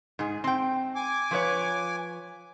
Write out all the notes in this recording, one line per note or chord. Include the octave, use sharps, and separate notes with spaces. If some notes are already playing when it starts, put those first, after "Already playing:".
G#2 G#4
C4 G5
G#5 D6
F3 B4 C#5